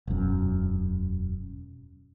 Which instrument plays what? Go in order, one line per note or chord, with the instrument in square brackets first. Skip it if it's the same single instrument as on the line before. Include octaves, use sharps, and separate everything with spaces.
[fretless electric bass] E1 F#2